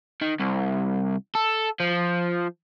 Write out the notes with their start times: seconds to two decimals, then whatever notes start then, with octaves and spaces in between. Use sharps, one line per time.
0.21 D#3
0.40 C2
1.35 A4
1.80 F3